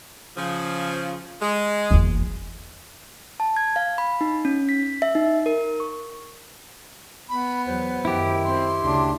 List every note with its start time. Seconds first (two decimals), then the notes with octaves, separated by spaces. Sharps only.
0.37 C#3 F3
1.42 G#3
1.91 F#1 E2
3.40 A5
3.57 G#6
3.76 F5
3.98 B5
4.21 D#4
4.45 C#4
4.69 B6
5.02 E5
5.15 D#4
5.46 A#4
5.80 C#6
7.29 B3 B5
7.66 E2 F#3 C5
8.05 F#2 D#3 E4 G4
8.43 C4 C6
8.82 D2 C#3 D4